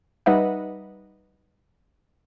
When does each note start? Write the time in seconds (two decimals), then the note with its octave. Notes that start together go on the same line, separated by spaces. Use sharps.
0.26 G3 D#4 B4 D#5 E5 F#5